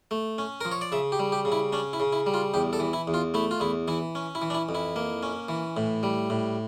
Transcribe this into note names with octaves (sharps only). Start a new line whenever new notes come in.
A3
C#4
F3 A#4
C#5
D5
C#3 E5
G4
G3
G4
C#3
E4
C#4 D4
E4
C#3
E4
G3
F4
E2 G4
A4
E3
E4
E2
F4
A3 E4
F4
E2 E4
E3 E4
C#4
E4
E3
D4
E4
F2
E4
A#3
C#4
E3
A2
G3
A2